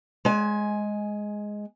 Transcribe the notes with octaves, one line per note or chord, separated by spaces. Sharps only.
G#3 G#5